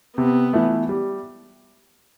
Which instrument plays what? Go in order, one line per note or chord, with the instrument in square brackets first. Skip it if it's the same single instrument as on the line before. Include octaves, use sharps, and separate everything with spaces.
[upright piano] C3 [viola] B3
[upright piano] E3 A3
G3